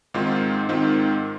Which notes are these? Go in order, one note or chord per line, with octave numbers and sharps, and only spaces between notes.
G#2 D#3 C4 F4
G#2 D#3 C4 F4